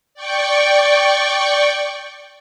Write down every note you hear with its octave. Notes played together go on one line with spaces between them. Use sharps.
D5 G5 C#6